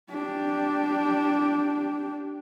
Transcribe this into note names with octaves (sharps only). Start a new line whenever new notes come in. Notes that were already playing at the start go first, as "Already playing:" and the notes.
D4 G4